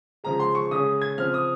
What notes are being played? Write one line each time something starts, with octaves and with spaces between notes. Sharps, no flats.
C#3 F3 G#3 A#5
C6
C#6
C#3 G#3 C#4 D#6
G#6
C#3 F3 C4 F6
D#6